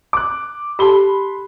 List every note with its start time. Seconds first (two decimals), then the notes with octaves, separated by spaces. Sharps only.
0.13 D6 F#6
0.79 G4 A4 A5 B5 C6 G7